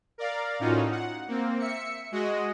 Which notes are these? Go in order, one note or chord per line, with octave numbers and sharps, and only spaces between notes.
A#4 D5 F5
A2 C#4 D#4 F4 F#4
F#5
A#3 C4
E5 C#7
G#3 F#4 D#5